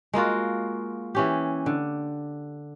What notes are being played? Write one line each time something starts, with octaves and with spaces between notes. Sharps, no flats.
G#3 A#3 F4 F#4
E3 C#4 G4
D3